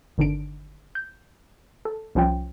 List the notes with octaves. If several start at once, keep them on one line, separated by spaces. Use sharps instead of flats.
G1 D3 D#3 D4 D7
G6
A4
C2 F3 C#4 F4 G5